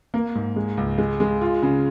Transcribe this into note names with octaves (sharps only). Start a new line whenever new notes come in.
A#3
G#2
G#3
C#2
G#3
G#3
F4
C#3